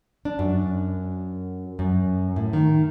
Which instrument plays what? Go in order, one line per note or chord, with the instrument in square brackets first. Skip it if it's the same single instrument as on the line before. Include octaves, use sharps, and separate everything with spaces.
[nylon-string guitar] D4
F#2
F#2
A2
D#3